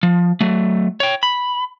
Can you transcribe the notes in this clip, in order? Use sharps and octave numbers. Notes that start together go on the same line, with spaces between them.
F3
F#3 A3
C#5 G5
B5